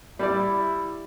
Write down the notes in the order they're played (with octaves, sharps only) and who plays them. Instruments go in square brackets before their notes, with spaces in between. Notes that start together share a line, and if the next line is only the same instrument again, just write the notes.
[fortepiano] G3 D5 [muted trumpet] E4